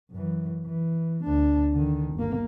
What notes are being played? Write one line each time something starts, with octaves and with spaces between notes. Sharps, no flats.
F#2 E3
E3
D2 D4
D3 D#3
G1 A#3